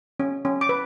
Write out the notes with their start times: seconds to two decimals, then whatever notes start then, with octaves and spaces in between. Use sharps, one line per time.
0.20 C#4
0.45 C#4
0.61 D6
0.69 B4